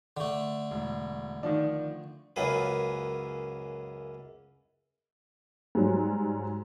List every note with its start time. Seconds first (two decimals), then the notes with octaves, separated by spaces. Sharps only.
0.17 D3 A3
0.71 E1
1.43 D#3 F3 D4
2.36 C#2 F#2 A#3 G#4 B4
5.75 G#2 F#3 G3